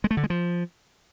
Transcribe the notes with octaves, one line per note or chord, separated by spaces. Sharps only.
G#3
A3
D3
G#3
F3